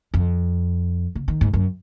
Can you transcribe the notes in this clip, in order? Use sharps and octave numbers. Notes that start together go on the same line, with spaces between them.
F2
C#3
D#3
G#2
F#2